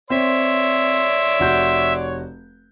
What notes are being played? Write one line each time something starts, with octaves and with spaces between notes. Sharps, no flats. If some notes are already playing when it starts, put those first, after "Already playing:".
C4 C#5 D5 E5 C6
F1 F#4 G6